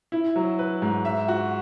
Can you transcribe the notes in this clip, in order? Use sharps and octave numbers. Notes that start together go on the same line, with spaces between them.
E4
F#3
B4
G#2
E5
F#4